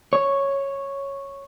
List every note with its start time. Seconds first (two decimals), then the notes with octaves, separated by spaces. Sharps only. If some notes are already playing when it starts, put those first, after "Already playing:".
0.13 C#5